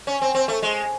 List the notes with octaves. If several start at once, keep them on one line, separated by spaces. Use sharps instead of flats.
C#4
C4
C4
A3
G#3